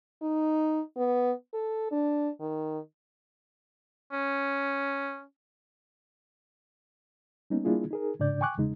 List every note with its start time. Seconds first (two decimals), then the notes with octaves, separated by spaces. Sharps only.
0.22 D#4
0.97 B3
1.54 A4
1.91 D4
2.40 D#3
4.12 C#4
7.50 G3 A#3 B3 C#4 D#4
7.65 G3 A#3 D4 E4 F4 G#4
7.91 D#4 G#4 A#4
8.19 G#2 C#3 D4 D5 G6
8.41 G5 G#5 C#6 D6 F#6
8.58 E2 C#3 G#3 D#4